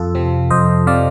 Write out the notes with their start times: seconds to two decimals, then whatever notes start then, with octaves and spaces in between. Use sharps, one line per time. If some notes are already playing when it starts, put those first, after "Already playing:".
Already playing: F2 F4 A4
0.15 C3 F3 C4
0.51 F2 C5 D#5
0.87 C3 F3 C4 D5 F5